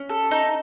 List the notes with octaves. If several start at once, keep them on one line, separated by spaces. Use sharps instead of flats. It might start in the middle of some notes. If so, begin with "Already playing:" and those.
Already playing: C#4
A4
D#4